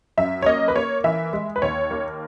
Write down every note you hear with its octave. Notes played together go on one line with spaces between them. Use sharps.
F#2 E5
C#5
A#3 D#5
B4
A#3 C#5
E3 E5
G#3
B4
D#2 C#5
A#3